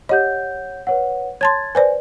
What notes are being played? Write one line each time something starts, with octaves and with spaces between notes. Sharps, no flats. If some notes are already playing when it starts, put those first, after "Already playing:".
G4 C#5 D#5 F#5 G6
B4 C#5 F#5
C#5 A5 C6 G#6 A6
B4 C5 D5 G#5